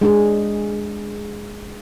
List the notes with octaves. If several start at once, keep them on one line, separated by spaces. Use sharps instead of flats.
G#3 D4 G#4